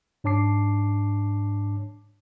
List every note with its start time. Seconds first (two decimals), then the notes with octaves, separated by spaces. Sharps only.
0.24 G#2 D4 C#5 A5 D6 C7